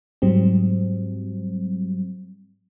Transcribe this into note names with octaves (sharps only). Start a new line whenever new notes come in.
G#2 F#3 G3 C4